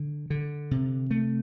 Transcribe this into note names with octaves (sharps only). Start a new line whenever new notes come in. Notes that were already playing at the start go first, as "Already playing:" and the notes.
Already playing: D3
D3
C3
A3